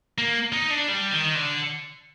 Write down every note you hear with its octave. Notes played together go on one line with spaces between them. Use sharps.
A#3
D#4
D4
G3
D#3
D3